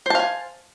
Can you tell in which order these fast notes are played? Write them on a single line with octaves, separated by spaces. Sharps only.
C5 A5 F5 G#5